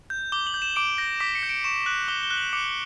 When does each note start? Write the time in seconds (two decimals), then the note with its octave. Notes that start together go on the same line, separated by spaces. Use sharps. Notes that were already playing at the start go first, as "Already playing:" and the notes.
0.10 G6
0.32 D6 G7
0.47 F#7
0.54 G6
0.62 E7
0.76 D6 D7
0.98 G6 A#6
1.20 D6 B6
1.35 C#7
1.43 G6
1.49 D7
1.64 C#6 E7
1.86 F#6 F#7
2.08 D6 G7
2.23 G7
2.30 F#6
2.37 F#7
2.53 D6 C#7